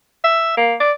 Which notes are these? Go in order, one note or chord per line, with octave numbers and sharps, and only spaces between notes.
E5
A#3
D5